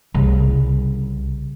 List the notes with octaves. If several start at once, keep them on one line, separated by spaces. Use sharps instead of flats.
C2 C#3